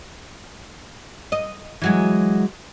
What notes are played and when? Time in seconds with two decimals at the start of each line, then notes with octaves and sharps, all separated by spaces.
1.32 D#5
1.82 E3 F#3 G#3